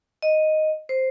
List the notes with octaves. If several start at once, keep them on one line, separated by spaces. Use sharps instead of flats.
D#5
C5